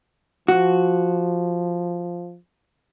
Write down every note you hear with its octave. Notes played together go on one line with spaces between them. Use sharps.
F3 F#4